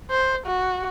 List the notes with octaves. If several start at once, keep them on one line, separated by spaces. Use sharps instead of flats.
C5
F#4